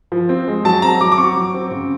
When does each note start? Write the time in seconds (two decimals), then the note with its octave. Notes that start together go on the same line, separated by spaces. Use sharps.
0.12 F3
0.29 C4
0.48 G#3
0.65 F#3 A5
0.82 C4 A#5
1.01 F#3 D6
1.12 D6
1.18 C4 C#6
1.36 F#3
1.54 C4
1.71 C#3